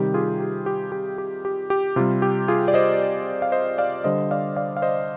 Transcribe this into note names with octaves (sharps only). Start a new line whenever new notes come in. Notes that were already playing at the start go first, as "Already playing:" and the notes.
Already playing: C3 D#3 G3 G4
F4 G#4
G4
G4
G4
G4
G4
G4
C3 G3 F4
G4
F4 G#4
D5
C5 D#5
F5
C5 D#5
D5 F5
D3 G3 C5 D#5
D5 F5
D5 F5
F5
C5 D#5